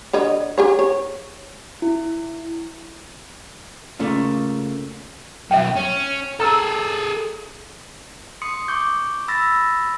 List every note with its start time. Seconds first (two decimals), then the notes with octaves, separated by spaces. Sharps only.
0.13 D3 C#5 D#5
0.58 G4 G#4 C#5
0.79 C#5
1.82 E4
3.99 C#3 A3 A#3 C#4 F4
5.51 F#2 B2 E5 G5
5.76 C#4
6.40 G#4 A4 A#5 D#6 E6
8.42 C6 D#6 C#7
8.68 C#6 D6 G6
9.28 B5 E6 A6 A#6